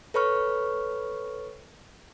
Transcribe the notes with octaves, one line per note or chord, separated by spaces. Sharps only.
A4 B4 C#5 B5 C#6 F6